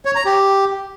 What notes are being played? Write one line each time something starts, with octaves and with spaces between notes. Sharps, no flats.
C#5
A#5
G4